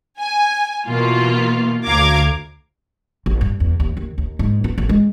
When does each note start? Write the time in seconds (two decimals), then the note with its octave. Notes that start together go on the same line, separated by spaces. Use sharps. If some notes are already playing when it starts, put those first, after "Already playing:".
0.19 G#5
0.87 B2 E3 A#3 F4
1.86 D2 F5 A#5 D6 G#6
3.26 A1
3.41 G2
3.60 E2
3.80 D#2
3.97 D#2
4.18 D#2
4.39 G#2
4.64 B3
4.78 A1
4.89 G#3